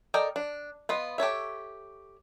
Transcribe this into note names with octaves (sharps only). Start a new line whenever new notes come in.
A4 A#4 D5 D#5 G5
D4
B3 F4 D#5
G4 A4 C#5 E5